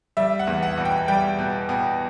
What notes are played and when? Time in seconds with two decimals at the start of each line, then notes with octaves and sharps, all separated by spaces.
0.17 G3 E5
0.39 F#5
0.47 E2
0.63 F#5
0.78 B2
0.85 G5
1.08 G3 G5
1.38 B2
1.69 B2